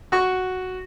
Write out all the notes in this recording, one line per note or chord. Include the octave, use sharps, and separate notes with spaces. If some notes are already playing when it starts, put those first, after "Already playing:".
F#4 C#6